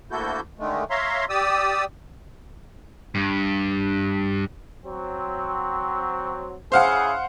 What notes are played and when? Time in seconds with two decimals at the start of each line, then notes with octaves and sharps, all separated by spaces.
0.11 D2 A#3 E4 F#4 A4 G6
0.59 D3 D#3 G#3 A3
0.90 C#5 E5 F5 A#5 C6
1.29 G4 D5 D#6 E6
3.15 G2
4.85 F#3 C4
6.72 C#3 E4 G#4 C5 F5 F#5